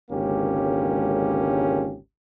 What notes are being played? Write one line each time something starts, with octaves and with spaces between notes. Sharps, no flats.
G#1 C#2 D3 A#3 C#4 G4